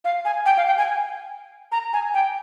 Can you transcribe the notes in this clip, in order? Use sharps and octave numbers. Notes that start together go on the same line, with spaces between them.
F5
G#5
G5
F5
G5
G#5
A#5
G#5
G5